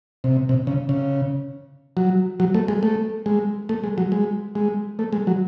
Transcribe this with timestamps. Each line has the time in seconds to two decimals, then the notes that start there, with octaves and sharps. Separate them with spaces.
0.24 C3
0.49 C3
0.67 C#3
0.89 C#3
1.97 F#3
2.40 F#3
2.54 A3
2.68 G#3
2.83 A3
3.26 G#3
3.69 A3
3.84 G#3
3.98 F#3
4.12 G#3
4.55 G#3
4.99 A3
5.13 G#3
5.27 F#3